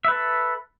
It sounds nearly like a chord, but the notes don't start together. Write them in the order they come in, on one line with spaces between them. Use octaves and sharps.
E5 B4 A4